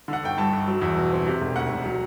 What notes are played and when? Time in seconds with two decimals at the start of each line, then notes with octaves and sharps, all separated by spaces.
0.08 D3 F#5
0.23 G1 G5
0.38 G2 A5
0.53 G1
0.67 F#3
0.81 E2
0.97 B2
1.12 C4
1.27 C3
1.41 E1
1.56 D2 F#5
1.71 E1
1.85 F#3